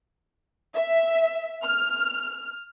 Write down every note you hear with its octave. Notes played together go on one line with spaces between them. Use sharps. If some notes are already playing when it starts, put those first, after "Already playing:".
E5
F6